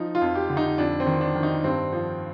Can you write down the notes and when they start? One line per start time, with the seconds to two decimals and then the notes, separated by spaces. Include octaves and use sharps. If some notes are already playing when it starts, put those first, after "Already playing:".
Already playing: F3 D#4
0.15 F4
0.22 F2
0.35 G4
0.50 D3
0.57 D#4
0.78 F2 D4
1.00 C4
1.07 D#3
1.21 D4
1.35 D#3
1.43 D#4
1.64 G2 C4
1.92 F3